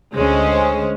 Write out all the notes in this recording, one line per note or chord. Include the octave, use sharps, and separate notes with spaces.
D2 G#3 C#4 C5